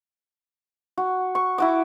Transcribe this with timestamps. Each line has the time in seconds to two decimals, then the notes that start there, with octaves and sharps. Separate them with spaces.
0.98 F#4
1.35 C#6
1.58 E4 F#4 D6